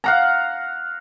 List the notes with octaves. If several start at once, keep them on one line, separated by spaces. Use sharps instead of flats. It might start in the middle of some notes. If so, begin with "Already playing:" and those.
F5 F#5 A#5